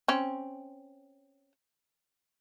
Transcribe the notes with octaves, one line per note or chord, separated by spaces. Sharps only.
C4 C#4